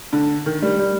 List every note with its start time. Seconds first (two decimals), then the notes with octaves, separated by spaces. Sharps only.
0.13 D3
0.46 D#3
0.62 G3
0.79 G3